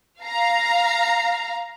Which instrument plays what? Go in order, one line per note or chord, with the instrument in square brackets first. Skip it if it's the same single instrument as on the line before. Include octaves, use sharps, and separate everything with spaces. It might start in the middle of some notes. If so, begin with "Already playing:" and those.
[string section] F5 A#5